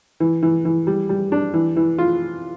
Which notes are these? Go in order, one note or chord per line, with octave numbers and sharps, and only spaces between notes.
E3
E3
E3
G3
G3
D4
E3
E3
F4